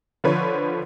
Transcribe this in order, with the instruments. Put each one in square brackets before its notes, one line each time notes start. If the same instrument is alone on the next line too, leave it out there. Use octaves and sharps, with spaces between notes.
[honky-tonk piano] D3 F3 B4 C#5